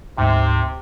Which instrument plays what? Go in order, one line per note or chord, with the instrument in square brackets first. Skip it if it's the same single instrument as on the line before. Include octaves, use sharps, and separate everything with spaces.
[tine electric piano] D2 G#2 G5 [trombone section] C3